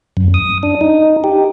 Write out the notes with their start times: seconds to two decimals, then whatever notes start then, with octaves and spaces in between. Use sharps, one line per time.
0.17 F#2
0.34 D#6
0.63 D4
0.81 D#4
1.24 G4